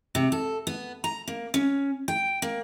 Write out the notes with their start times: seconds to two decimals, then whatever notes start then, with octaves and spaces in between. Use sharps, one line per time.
0.15 C3
0.32 A4
0.67 B3
1.04 A#5
1.28 A#3
1.54 C#4
2.08 G5
2.42 A#3